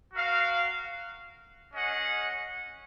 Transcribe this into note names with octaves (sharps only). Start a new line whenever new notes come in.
F#4 A#4 F5
C#4 G#4 D#5 F#5